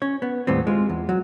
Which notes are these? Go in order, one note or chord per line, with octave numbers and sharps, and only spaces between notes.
C#4 C#5
B3
D#2 A2 G3 B3 C4
G#3 F4
E2
F#3